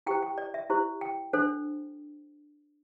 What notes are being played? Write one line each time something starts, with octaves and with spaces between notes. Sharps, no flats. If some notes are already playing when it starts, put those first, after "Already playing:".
E4 G4 C5 G5
G5
D5
E5
E4 G4 C5
G5
D4 A4 C5